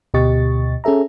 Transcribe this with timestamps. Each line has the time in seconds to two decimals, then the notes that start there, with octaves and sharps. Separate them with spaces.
0.14 D2 B2 G4 D#5 C#6 A6
0.84 C#4 G#4 A4 E5 A#5